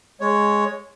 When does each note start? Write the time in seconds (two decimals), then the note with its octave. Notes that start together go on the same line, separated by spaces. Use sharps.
0.20 G#3 C#5